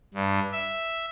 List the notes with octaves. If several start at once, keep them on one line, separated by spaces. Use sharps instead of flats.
G2
E5